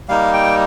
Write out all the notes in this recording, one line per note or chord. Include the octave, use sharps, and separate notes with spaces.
G3 A#3 D#4 F5
G5